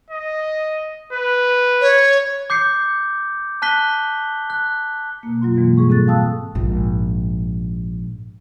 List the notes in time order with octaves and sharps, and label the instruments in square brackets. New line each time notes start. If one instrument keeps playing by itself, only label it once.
[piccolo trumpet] D#5
B4
[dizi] C#5
[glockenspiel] D6 G6 C7 C#7
A5 F#6 B6 G7
F#6
[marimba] B2 A#3
F#2 F#3 F4 C6
B2 E3 G#3 A#3
G#2 G3 G#4 C#6
C4 A4 C#6 F#6 A6
F5 G5 A5 D#6 E6 F#6
[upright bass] A#1 G#2